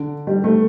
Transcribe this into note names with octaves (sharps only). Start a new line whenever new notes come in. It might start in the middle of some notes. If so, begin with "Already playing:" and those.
Already playing: D3
G3
A3